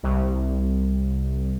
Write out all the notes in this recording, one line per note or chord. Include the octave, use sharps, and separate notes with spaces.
C2